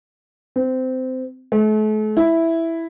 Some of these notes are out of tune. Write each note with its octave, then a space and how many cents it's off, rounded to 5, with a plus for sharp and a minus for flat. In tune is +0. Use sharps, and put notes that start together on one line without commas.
C4 -20
A3 -40
E4 +0